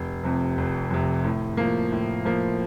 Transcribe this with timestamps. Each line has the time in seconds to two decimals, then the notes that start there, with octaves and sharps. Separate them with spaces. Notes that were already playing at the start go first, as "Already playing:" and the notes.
Already playing: F1
0.23 F2 C3
0.58 F1
0.90 F2 C3
1.24 A2
1.57 F3 A#3
1.92 A2
2.25 F3 A#3